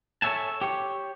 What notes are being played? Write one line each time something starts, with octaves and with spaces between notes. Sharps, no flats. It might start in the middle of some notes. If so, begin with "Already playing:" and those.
A4 C#5 D5 E5 G#5 A5
G4 C#5